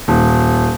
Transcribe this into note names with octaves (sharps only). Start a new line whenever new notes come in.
D#1